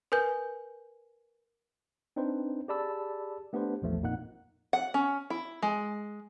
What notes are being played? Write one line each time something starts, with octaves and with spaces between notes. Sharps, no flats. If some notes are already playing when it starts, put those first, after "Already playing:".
A#4 B4 G#5 G6
C4 D4 D#4 B4 C5
G4 G#4 D5 A5 B5 E6
A3 B3 D4 G4 B4 C5
A#1 E2 F3 A3
F2 A#2 A#3 D#4 F#5 F#6
F#5
C#4
E4
G#3